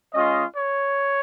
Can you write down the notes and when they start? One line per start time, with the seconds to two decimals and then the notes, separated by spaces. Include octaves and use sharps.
0.14 G#3 C#4 F4 D#5
0.56 C#5